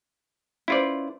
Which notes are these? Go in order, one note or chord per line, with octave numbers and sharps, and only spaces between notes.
C#4 E4 F4 B4 C5 D5